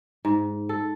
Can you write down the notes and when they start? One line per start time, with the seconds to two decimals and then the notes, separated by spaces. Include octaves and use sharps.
0.25 G#2
0.69 A4